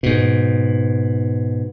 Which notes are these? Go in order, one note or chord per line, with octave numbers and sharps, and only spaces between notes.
G#2 B2